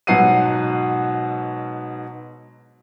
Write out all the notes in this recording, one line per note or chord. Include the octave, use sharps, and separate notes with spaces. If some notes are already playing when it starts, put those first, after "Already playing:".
G#2 B2 F#3 F#5 C7 D#7